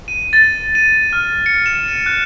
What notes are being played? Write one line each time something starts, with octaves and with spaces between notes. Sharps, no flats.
D#7
A6
D#7
F6
C#7
E7
D#7
F#6